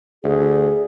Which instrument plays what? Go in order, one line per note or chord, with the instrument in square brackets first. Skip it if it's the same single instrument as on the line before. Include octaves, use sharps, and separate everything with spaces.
[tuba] D2 [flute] G#4